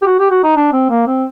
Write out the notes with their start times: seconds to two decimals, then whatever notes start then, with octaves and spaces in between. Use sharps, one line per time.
0.02 G4
0.06 F#4
0.19 G4
0.30 F#4
0.44 D#4
0.56 D4
0.73 C4
0.90 A#3
1.07 C4